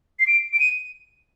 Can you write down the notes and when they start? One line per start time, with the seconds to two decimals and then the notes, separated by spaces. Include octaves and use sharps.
0.20 C7
0.27 D7
0.53 D7
0.59 D#7